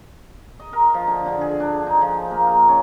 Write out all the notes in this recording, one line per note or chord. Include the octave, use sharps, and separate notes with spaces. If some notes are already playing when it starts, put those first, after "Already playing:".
D#5
A#4
F3
D3
D3
G#4
D4
D#4
F3
A#3
A#4
C#4